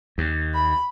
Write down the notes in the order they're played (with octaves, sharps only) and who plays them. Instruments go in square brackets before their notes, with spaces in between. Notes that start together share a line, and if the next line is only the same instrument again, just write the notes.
[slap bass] D#2
[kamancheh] B5